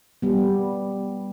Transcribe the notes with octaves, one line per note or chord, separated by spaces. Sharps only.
G3 B3